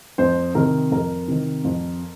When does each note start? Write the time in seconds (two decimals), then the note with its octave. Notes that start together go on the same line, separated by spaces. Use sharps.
0.18 F2 C5
0.55 C3 D#3 A#4
0.92 F2 A#4
1.28 C3 D#3
1.64 F2